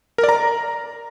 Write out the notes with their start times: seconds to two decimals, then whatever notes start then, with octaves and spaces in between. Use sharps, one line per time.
0.18 A#4
0.24 D5
0.29 A#5